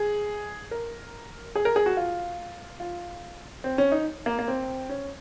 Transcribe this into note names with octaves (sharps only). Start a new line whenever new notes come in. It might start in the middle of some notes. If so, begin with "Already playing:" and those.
Already playing: G#4
A#4
G#4
A#4
G#4
F#4
F4
F4
C4
C#4
D#4
A#3
A#3
C4
C#4